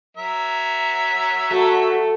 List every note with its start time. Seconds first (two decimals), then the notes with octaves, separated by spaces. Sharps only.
0.17 F#3 A#4 E5
1.51 A3 F#4